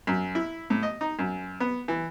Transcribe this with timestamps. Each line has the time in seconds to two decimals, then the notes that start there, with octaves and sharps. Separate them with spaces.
0.07 F#2
0.35 E4
0.70 A2
0.83 D#5
1.01 D#4
1.19 F#2
1.60 B3
1.88 E3